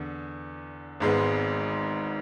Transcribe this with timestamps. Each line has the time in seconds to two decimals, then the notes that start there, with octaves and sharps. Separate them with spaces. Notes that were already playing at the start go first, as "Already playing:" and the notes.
Already playing: E2 D3
1.00 G#1 G#2 G#3 B3